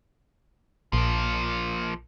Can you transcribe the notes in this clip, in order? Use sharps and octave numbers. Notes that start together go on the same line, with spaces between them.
A#1 F3 A#3